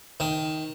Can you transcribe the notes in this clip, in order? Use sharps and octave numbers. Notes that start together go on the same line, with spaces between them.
D#3